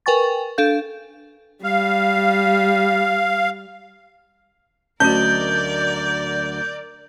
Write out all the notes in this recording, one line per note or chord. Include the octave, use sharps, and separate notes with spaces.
A#4 B4 G5 G#5 C#6 A6
D4 A4 F5 G6
G3 F5
D2 F#3 C#4 F#4 A#4 D5 D#5 G6